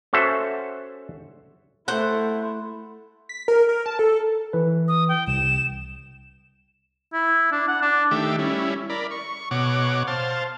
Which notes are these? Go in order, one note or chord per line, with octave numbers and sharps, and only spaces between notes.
C#4 F#4 A4 C5 E5
A3 E4 C5 F#5
B6
A#4
A#4
A5
A4
E3 B4
D#6
G5
C2 E7
E4
D4
F#5
D4
D#3 A3 G4 E5 D6
G3 C#4 E4
A#4 D5 B5
C#6
B2 C#5 F#5 D6
C5 F5 A5